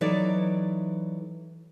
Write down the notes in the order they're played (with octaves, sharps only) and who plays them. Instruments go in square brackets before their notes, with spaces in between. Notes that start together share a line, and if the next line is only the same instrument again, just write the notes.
[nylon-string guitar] E3 F#3 D#4 A4 D5